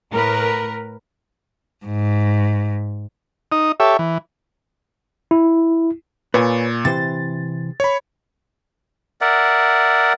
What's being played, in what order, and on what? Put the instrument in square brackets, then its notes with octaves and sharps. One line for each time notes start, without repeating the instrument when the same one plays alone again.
[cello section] A2 A#4 B4
[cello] G#2
[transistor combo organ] D#4 D#6
G4 A4 C#5 E5
E3
[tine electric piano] E4
[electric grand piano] A#2 [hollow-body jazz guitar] B4 C#5 G#5
[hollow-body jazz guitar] C3 E3 C5 [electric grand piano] A6
[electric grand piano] C#5 B5
[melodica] A#4 D5 E5 F#5